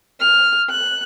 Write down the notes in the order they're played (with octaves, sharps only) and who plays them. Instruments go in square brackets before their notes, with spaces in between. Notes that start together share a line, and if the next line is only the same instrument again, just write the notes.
[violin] F6
F#6